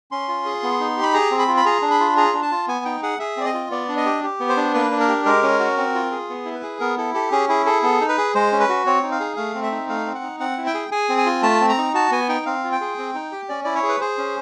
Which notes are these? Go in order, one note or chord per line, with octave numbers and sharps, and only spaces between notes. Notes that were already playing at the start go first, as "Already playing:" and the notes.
C#4 C6
F4
G#4
B3
D#4
G4
B5
G#4 A#5
C4
B5
F4
B5
G#4 A#5
D4
B5
F4
G#4 A#5
D4
A5
F4
B3 G#5
D#4 G5
G#4 F#5
G#4 E5
C4 D5
D#5
F4
B3 D5
D4
D#5
G4
G4
B3
C5
D4
A#3 B4
D4
A#4
G4
G#3 A#4
C#4
F#4
C4
F4
G#4
B3
E4
B4
G#4
B3 A#4
E4 A4
G4 A4
C#4 G#4
E4 G#4
G#4 A4
B3 A4
D#4
B4
G#4
G#3 C5
C#4
B4
F#4
C4 C#5
D#4
F5
G#4
A3 F5
C4
E5
D#4
A3 F5
C4
F#5
D#4
C4 F#5
E4
G5
G#4
G#4 G#5
C4
G#5
F4
A3 A5
C4
A#5
D#4
F#4 A5
B3 G#5
D#4 G5
C4 F5
F4
G5
G#4
C4
D#4
G4
C#4 D5
E4 D5
C#5
G#4
B4
G#4 C5
C#4